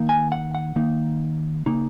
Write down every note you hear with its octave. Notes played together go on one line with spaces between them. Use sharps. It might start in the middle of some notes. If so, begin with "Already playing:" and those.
Already playing: D#3 A#3 D#4
G#5
F#5
F#5
D#3 A#3 D#4
C#3 A#3 D#4